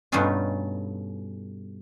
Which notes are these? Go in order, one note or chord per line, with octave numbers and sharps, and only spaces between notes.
G2 B2 A3 C#4 D#4 F4